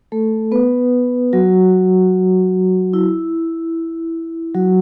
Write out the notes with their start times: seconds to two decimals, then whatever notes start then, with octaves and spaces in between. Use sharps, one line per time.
0.12 A3 A4
0.52 B3 B4
1.33 F#3 F#4
2.93 E4
4.55 F#3 F#4